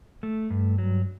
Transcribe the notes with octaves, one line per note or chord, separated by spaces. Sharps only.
A3
G2
F#3